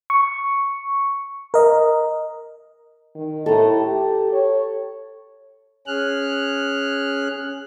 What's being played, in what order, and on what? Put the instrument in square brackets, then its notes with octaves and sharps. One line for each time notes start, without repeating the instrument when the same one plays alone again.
[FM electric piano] C#6
A#4 D#5
[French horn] D#3
[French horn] A2 [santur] A4 A#5
[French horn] G4
C#5
[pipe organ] C#4 G#4 F6 F#6